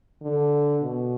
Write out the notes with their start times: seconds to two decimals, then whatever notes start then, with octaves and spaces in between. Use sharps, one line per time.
0.22 D3
0.82 B2